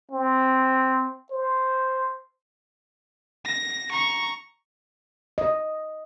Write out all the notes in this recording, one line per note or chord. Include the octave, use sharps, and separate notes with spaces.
C4
C5
A#6
A#5 C#6
D#5